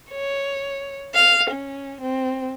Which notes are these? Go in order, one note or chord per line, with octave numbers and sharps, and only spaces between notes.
C#5
F5
C#4
C4